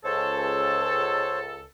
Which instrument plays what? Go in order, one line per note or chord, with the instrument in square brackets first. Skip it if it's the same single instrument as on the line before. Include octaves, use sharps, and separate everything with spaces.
[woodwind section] C#2 A4 [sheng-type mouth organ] C5 C#5